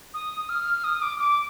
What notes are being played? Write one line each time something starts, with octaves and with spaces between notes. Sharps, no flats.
D#6
F6
D#6
D6
D6